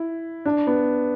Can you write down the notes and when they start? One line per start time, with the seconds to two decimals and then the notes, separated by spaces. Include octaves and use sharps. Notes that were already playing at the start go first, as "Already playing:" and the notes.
Already playing: E4
0.45 D4
0.67 B3